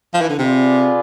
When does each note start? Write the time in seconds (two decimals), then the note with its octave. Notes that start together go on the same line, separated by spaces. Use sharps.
0.14 F3
0.21 E3
0.29 D3
0.38 C3 F4 G#4 B4 D5